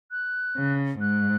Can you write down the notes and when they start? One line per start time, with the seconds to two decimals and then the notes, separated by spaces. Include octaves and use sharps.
0.11 F#6
0.56 C#3
1.00 G#2 F#6